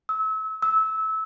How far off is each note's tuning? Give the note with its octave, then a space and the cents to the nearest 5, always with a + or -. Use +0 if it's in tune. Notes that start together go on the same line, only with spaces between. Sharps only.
E6 -30
E6 -20